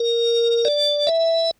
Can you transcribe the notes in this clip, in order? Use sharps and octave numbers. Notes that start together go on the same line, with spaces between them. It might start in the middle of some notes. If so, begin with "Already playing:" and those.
Already playing: A#4
D5
E5